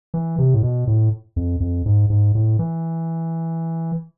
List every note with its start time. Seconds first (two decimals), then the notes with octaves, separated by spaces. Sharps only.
0.14 E3
0.38 C3
0.54 A2
0.63 B2
0.87 A2
1.36 F2
1.60 F2
1.86 G#2
2.10 G#2
2.35 A2
2.59 E3